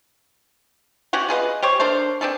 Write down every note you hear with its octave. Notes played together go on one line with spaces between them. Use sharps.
C#4 F#4 G4 F#5
F4 G#4 B4 D#5
G4 C5 C#5
D4 A4 A#4 C5
C4 D4 G#4 A4